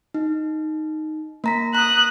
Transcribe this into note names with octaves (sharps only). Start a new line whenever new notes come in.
D#4
A#3 A#5 B6
A#5 D#6 F#6